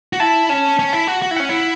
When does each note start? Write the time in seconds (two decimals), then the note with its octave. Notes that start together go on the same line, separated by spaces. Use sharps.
0.13 F#4
0.20 E4 A5
0.49 C#4 A5
0.79 C#4
0.93 E4
1.07 F#4
1.22 F#4
1.31 E4
1.37 C#4 F#5
1.49 E4